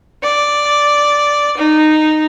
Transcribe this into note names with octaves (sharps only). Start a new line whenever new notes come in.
D5
D#4